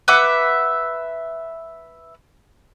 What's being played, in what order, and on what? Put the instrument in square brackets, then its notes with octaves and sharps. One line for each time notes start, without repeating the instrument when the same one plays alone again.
[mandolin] B4 E5 F#5 D6